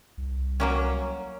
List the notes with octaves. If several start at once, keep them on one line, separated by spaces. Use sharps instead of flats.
C2
F#3 A#3 C#4